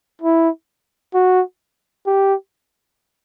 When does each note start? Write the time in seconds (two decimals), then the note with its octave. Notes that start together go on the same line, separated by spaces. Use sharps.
0.22 E4
1.14 F#4
2.07 G4